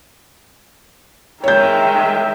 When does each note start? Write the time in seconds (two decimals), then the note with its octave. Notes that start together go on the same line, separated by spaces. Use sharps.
1.44 D#3 G#3 C#5 E5 G5 G6